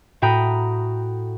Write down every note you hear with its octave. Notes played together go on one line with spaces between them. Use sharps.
A2 F#4 G5 A#5 B5 D#6